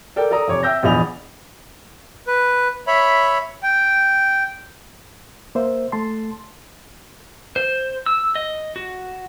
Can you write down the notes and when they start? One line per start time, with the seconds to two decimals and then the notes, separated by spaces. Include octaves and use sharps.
0.16 A4 A#4 D5 G5
0.31 A4 D5 A#5 D#6
0.48 F1 C#5 D6
0.63 E5 G5 E6 G6 A#6
0.83 A#1 E2 G#4 D#5 B5 F7
2.27 B4
2.87 C#5 E5 B5
3.63 G5
5.55 A#3 C5 E5
5.92 A3 A5 C6
7.56 C5
8.06 E6
8.35 D#5
8.76 F#4